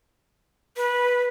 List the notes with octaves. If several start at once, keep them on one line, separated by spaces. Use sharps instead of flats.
B4